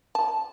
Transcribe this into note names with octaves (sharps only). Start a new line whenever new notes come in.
A5